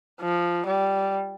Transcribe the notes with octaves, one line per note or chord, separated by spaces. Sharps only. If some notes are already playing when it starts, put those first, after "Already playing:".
F3
G3